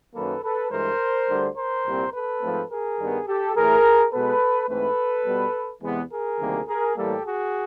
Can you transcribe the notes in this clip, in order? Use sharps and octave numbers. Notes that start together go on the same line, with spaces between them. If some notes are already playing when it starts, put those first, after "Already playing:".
F#2 D#3 F#3 A#3 A4 B4
A4 B4
G2 E3 G#3 A#4 C5
D2 D3 G3
A#4 C5
C2 A#2 G3 C4
A4 B4
G#2 F3 A3 C4
G#4 A#4
G2 D#3 G3 B3
G4 A4
A2 E3 A3 G#4 A#4
B2 G#3 B3 A4 B4
G#2 E3 A3 C4 A4 B4
B2 G3 B3
E2 C3 E3 G#3 B3
G#4 A#4
D2 C3 D#3 G3 A#3
G#4 A#4
A2 E3 G3 A#3 G4 A4
F#4 G#4